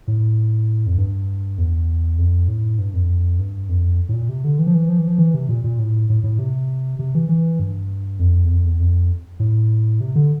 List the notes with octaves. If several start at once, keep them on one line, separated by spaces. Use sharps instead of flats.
A2
F2
G2
E2
F2
A2
G2
F2
G2
F2
A2
A#2
C3
D3
E3
F3
E3
F3
E3
F3
E3
C3
A#2
A#2
A2
A2
A2
C3
C3
E3
E3
G2
F2
E2
F2
E2
F2
A2
C3
D3